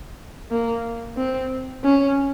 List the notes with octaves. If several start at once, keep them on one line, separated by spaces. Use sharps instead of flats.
A#3
C4
C#4